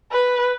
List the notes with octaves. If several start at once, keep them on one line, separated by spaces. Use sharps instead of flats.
B4